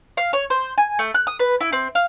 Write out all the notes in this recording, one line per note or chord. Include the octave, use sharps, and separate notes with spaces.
F5
C#5
C5
G#5
A3
F#6
D#6
B4
E4
C4
F5